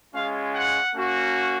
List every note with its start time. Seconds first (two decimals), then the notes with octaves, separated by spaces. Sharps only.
0.14 G#3 C#4 F4 F5
0.54 F#5
0.94 A#3 C#4 F#4